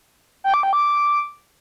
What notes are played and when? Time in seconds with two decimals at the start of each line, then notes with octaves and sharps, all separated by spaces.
0.44 G5
0.54 D6
0.63 G5
0.73 D6